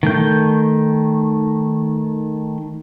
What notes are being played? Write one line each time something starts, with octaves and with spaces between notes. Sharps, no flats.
D#3 A3 G6